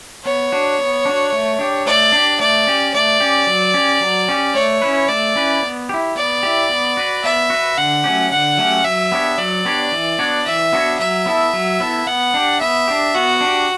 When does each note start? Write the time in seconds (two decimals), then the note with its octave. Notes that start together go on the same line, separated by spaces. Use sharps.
0.25 B3 C#5
0.52 D4 F#4
0.79 B3
1.05 D4 F#4
1.32 A3
1.59 D4 G4
1.86 A3 D5
2.12 D4 G4
2.40 A3 D5
2.67 C#4 G4
2.94 A3 D5
3.20 C#4 G4
3.47 F#3
3.74 C#4 G4
4.01 F#3
4.29 C#4 G4
4.54 A3 C#5
4.82 C#4 E4 B4
5.08 A3 D5
5.35 C#4 E4 B4
5.62 B3
5.89 E4 G4
6.16 B3 D5
6.43 E4 G4
6.69 B3
6.97 F#4 B4
7.23 B3 E5
7.50 F#4 B4
7.77 D3 F#5
8.04 F#3 A3 C#4 G4
8.31 D3 F#5
8.58 F#3 A3 C#4 G4
8.84 F#3 E5
9.12 B3 D4 G4 C#5
9.38 F#3 D5
9.65 B3 D4 G4 C#5
9.92 E3
10.19 B3 D4 F#4 C#5
10.46 E3 E5
10.73 B3 D4 F#4 C#5
10.99 F#3 E5
11.26 B3 E4 A4
11.53 F#3
11.80 B3 E4 A4
12.07 B3 F#5
12.34 D4 G4
12.60 B3 E5
12.88 D4 G4
13.14 B3 F#4
13.41 D4 G4